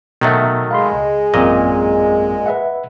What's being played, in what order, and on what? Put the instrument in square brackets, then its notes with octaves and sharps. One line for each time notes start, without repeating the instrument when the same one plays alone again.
[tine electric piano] B2 E5 [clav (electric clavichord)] D#3 F#3 A3
[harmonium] G#3 [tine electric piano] F5 B5 C6
[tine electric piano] C#2
[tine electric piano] A1 F#2 C4 [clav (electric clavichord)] A#2 D#5
[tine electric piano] B4 E5 F#5